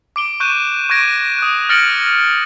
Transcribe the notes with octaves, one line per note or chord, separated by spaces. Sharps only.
D6 D7 G7
C#6 F#6 G6 D#7 E7
C#6 F#6 G#6 A#6 D7 D#7
D#6 F#6
F6 A6 A#6 C#7 D7 F#7